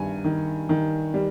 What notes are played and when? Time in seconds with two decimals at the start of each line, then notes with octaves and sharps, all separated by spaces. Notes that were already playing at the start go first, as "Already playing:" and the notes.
Already playing: G2 D#3 G#5
0.25 D#3
0.69 D#3
1.14 G3